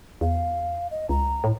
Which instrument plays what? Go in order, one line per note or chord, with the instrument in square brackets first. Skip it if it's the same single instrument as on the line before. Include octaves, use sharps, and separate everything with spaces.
[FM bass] E2 [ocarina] F5
[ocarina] D#5
[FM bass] C#2 [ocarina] A#5
[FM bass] A2